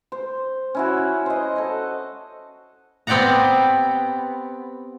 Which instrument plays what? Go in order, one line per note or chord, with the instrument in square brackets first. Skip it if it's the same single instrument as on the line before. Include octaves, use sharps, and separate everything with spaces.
[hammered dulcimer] C5
C#4 E4 F#4
C5 D#5
A4 D#5
[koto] B3 C4 G4 D5 F#5 A#5